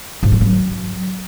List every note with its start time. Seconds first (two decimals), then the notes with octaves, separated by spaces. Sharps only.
0.23 G#2
0.32 F3
0.41 F#3